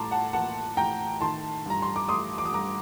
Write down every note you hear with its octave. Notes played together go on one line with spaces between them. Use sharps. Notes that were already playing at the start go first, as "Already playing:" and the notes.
Already playing: A2 G3 A5 A#5 C6 D6
F#5 A5
A#3 F#5 A5
A2 G5 A#5
D#3 A5 C6
G2 A#5
C6
D6
A3 C6 D#6
D6
D#6
G2 A#5 D6